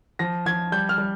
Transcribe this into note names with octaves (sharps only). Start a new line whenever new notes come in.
F3 A#6
F3 G#6
G3 G6
F6
G3